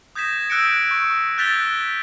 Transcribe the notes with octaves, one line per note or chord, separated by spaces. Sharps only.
D#6 G6 G#6 A#6 B6 E7
E6 F#6 G6 A#6 C#7 D7
C#6
F#6 G6 A6 B6 F7 G7
G7